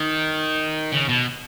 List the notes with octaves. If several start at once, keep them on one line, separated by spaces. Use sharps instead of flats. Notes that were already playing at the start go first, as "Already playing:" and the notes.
Already playing: D#3
C#3
B2